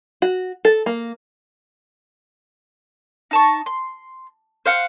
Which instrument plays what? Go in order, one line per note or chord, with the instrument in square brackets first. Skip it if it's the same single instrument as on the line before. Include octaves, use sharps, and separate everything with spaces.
[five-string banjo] F#4
A4
A#3
[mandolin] D#4 A5 C#6
C6
C5 F5 F#5